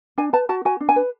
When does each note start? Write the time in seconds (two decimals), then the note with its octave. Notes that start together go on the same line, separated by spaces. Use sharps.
0.18 D4 G#5
0.33 B4 A5
0.49 F#4 A5
0.65 F#4 G#5
0.81 D4
0.89 G#5
0.96 B4